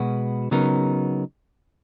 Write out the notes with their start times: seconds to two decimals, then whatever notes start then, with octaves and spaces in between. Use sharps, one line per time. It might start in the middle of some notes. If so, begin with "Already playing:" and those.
Already playing: B2 G#3 B3 F#4
0.51 C#3 F#3 B3 D#4 A#4